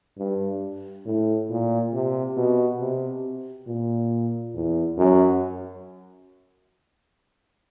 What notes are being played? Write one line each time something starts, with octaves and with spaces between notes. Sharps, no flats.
G2
A2
A#2
C3
B2
C3
A#2
E2
F#2